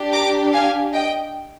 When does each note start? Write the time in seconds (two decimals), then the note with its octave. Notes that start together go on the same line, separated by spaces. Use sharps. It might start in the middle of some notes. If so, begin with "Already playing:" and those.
Already playing: D4 G4
0.12 A#5 D6
0.53 F5 G#5
0.94 D#5 G5